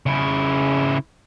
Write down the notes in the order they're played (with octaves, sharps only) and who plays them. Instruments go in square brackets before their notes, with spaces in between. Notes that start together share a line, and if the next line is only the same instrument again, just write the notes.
[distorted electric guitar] C#3 E4